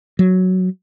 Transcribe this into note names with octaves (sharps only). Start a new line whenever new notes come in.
F#3